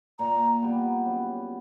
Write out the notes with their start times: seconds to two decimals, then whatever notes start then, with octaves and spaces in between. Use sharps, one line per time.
0.19 A#2 A#5
0.62 G3 B3
1.06 F#2